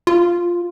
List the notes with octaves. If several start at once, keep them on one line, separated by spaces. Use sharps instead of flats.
F4